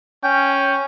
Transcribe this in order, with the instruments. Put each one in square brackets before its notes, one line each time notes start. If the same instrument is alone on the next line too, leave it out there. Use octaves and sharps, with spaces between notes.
[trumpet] C#4 [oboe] G5